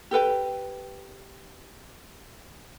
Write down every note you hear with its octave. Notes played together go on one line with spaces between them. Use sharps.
G4 A4 B4 G5